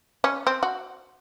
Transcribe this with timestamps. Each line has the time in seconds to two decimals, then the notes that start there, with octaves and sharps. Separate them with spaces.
0.24 C#4
0.47 C4
0.63 F#4